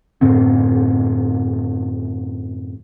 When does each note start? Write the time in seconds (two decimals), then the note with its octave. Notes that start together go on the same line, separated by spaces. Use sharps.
0.21 F#2 A2 D3 C4